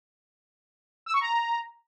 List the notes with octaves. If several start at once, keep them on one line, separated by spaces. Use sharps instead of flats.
E6
C#6
A#5